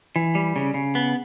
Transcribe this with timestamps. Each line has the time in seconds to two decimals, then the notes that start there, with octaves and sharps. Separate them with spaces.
0.16 E3
0.35 G3
0.56 C#3
0.74 C#3
0.95 B3